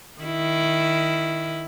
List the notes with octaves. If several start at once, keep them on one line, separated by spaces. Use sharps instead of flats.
D#3 E4